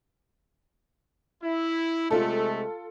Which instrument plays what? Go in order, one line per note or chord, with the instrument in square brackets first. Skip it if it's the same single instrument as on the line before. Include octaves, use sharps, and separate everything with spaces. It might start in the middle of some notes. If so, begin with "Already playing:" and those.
[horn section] E4
[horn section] C3 G#3 A3 [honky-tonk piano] F4 A4